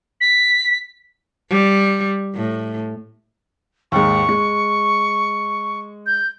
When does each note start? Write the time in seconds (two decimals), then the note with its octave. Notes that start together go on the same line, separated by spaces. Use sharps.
0.21 B6
1.50 G3
2.35 A2
3.92 D#2 G#2 C#6
4.29 G#3
6.06 G6